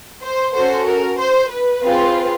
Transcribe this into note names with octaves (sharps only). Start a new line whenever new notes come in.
C5
C#4 F#4 A4 C5
A#4
C5
B4
C4 F4 G#4